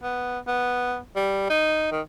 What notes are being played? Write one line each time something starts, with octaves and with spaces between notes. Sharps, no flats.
B3
B3
G3
D#4
D#3